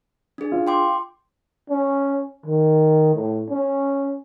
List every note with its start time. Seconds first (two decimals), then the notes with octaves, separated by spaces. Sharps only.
0.38 D4 G#4
0.52 F4
0.67 G5 C6 D6
1.69 C#4
2.46 D#3
3.14 A2
3.50 C#4